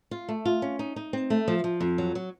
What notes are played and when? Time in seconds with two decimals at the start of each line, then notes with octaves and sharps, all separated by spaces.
0.11 F4
0.29 A3
0.45 F4
0.62 C#4
0.79 D#4
0.96 D#4
1.13 C4
1.30 A3
1.48 F3
1.64 F3
1.80 F2
1.98 F#3
2.15 F#3